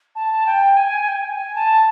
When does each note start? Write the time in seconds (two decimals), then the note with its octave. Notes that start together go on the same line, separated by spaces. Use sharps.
0.15 A5
0.46 G5
0.77 G#5
1.08 G5
1.31 G#5
1.55 A5